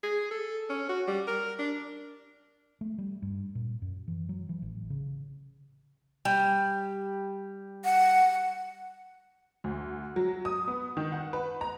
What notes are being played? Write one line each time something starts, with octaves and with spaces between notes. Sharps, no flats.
G#4
A4
C#4
F#4
G3
A#4
D4
A3
G3
G2
A#2
F#2
E3
F#3
E3
A1
C#3
G3
F#5
D2
F#3
D#6
B3
D#3
F#5
B4
A#5